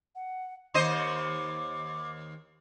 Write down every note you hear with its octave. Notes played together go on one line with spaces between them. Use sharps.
F#5
D#2 C5 D#5 D6